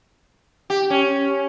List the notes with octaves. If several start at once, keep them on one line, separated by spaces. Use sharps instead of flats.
G4
C#4